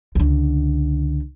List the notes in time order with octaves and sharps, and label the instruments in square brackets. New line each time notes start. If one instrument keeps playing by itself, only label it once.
[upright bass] C#2 D3